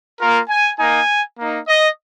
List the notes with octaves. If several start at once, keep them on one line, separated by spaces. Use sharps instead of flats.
A#3 F4 A#4
G#5
A#3 D#4 G#5
A#3 D#4
D#5